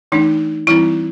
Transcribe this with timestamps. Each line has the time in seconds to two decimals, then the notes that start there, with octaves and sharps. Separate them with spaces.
0.12 E3 A3 D4 D#4
0.67 E3 G3 C4 E4